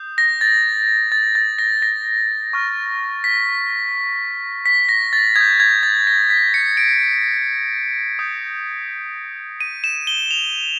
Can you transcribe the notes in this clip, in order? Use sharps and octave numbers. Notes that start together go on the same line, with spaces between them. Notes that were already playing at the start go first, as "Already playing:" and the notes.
Already playing: D#6 G6
A#6
A6
A6
A6
A#6
A#6
C#6 F6
B6
B6
A#6
A6
D#6 G6 G#6
G#6
A6
A#6
B6
C#7
D7
D#6 G6
D#7
E7
G7
F7